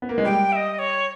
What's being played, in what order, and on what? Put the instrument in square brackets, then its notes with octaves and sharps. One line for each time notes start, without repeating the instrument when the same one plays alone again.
[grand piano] B3
A#3
G#3
[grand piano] G3 [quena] G5
[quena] E5
D#5
C#5